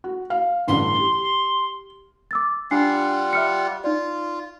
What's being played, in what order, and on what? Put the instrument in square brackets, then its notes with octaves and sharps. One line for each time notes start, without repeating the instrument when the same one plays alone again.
[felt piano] F#4
F5
[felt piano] A1 D2 G2 [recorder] C6
[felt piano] G4
[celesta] D6 E6 A6
[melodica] G3 F4 F#5 [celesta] D4 G#5 C7
[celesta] E5 F6 C#7
[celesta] D#4 D5 [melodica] F4